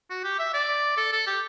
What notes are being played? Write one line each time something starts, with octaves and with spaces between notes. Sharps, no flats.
F#4
G4
E5
D5
A4
A4
G4